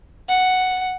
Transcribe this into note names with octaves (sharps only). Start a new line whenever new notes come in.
F#5